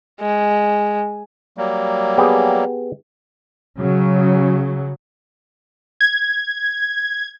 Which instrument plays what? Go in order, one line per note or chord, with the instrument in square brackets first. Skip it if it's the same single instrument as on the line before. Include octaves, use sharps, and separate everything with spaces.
[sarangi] G#3
[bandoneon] F#3 G3 A#3
[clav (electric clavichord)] B3 G4 G#4
[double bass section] C#3 F#3
[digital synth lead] G#6